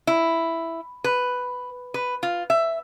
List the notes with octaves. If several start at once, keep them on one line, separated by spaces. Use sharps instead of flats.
E4
B4
B4
F4
E5